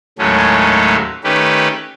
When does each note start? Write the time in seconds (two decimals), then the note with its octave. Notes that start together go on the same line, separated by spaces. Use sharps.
0.19 D#2 A2 F#3 G#3 A3 C#4
1.24 D#3 A3 C#4 G4 B4